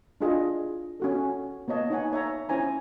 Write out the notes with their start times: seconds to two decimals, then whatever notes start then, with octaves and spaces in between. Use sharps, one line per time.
0.21 D4 E4 F4 G#4 D#5
1.00 C#4 F#4 A4
1.68 A#3 B3 C#5 D#5 A5
1.90 D#4 C#5 F#5 G#5
2.13 C#5 E5 A#5
2.49 C#4 E4 C5 G#5 A#5